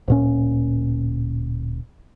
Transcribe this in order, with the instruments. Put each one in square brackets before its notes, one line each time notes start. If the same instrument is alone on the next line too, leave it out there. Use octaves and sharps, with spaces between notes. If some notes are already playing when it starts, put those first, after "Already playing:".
[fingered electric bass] D1 A#2 C#4